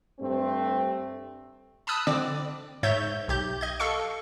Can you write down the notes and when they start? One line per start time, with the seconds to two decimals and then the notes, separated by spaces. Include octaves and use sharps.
0.20 G2 A3 C4
1.87 A5 B5 D#6 E6 F#6
2.07 D3 C4 D5 D6
2.83 G#2 C#5 E5 G6 A6
3.28 B1 G4 G6
3.61 D#5 G#6
3.80 A4 F5 C#6 C#7